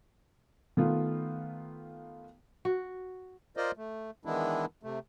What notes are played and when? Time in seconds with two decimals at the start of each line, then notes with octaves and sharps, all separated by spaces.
0.77 D#3 A3 B3 F4
2.65 F#4
3.57 F4 A#4 C5 D5 D#5
3.77 A3
4.25 D#3 E3 G#3 B3 D4 E4
4.83 C3 A3